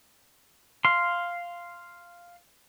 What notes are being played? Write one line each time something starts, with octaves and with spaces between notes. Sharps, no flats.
F5 C6